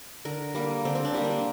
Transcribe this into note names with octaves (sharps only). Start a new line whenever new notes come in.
D3 A#4
G3 A#3
D3 C4
C4
D4
G3 A#3
D4